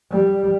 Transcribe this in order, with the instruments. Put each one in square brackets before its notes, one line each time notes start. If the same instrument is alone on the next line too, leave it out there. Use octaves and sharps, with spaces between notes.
[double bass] G3